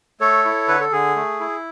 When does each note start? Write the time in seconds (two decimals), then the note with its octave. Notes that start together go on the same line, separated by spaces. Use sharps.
0.20 A3 A4 C#5
0.45 E4
0.68 D3 B4
0.80 A4
0.92 D3 G#4
1.16 A3
1.40 E4